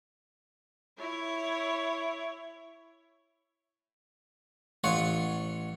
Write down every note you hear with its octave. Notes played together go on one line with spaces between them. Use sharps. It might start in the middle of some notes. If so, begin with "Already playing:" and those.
E4 C#5
A1 F4 C#5 F#5